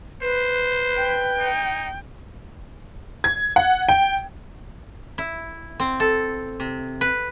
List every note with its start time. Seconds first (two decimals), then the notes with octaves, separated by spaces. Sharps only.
0.22 B4 C5
0.96 G5
1.39 D#4
3.24 G#6
3.56 F#5
3.89 G5
5.18 E4
5.80 C4
6.00 A4
6.60 C3
7.01 B4